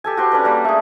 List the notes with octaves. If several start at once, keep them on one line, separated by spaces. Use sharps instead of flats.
G4 A4 G#5
F#4 G4 C5
C#4 D4 B4
G3 A#3 A#4
A3 G#4